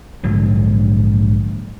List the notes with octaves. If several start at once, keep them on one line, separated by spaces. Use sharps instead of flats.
A#1 G#2 D3 F#3